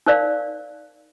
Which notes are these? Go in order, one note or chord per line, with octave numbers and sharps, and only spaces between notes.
D#4 A#4 C5 D5 F5